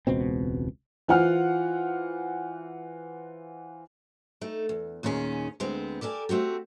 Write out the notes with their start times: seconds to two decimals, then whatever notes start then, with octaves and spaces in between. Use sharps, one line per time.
0.07 E1 C#2 B2 C4
1.08 E3 F4 C5 F#5 F6
4.41 A3 D#4
4.69 E2
5.03 D#2 A#2 D#3 C#4 G#4
5.60 D2 G#3 B3 C4
6.01 G4 A4 A#4 D5 G#5
6.29 A3 C4 F#4 G4